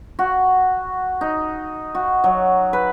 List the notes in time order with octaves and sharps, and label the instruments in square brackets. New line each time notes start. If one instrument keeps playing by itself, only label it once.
[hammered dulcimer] F#4
D#4
F#4
F#3
B4